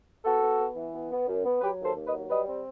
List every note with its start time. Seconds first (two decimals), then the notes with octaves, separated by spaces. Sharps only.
0.25 B3 F#4 A4
0.42 B3
0.60 B3
0.76 E3
0.93 B3
1.11 B3
1.27 F#2
1.45 B3
1.61 F#3 G4 B4
1.79 D#2
1.84 A4 C5
1.95 D#2
2.07 B4 D#5
2.13 F#3
2.30 G3 B4 D#5
2.47 C4